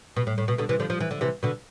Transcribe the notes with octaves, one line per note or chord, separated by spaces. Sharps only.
B2
A2
A2
B2
B2 D3
C3 E3
D3 F3
F3
E3
D3
C3 E3
B2 D3